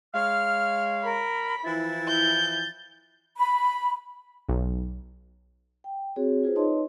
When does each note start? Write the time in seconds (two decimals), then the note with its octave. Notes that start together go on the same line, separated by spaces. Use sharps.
0.14 G#3 C#5 F5 F6
1.04 A#4 B5
1.65 E3 F3 E4 A6
2.08 G6
3.36 B5
4.49 B1
5.84 G5
6.16 C4 F#4 G#4 C#5
6.43 F4 G#4 B4 C5
6.56 D#4 B4 C#5 D#5 A5 C6